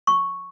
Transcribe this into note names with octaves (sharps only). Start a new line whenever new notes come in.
C#6